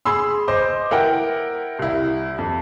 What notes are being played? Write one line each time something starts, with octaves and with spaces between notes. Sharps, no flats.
G#4 B5 C6 E6
C5 D#5 C6 D6
E4 A#4 F#5 G5
C2 E4
F2